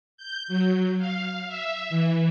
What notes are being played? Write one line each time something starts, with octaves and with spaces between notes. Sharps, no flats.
G6
F#3
F5
E5
E3